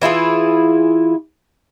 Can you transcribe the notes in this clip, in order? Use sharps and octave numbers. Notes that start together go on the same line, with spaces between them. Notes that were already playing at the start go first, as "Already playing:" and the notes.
E3 E4 F4 G#4